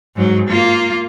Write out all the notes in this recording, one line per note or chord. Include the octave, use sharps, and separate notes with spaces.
G#2 F#3
A#3 F4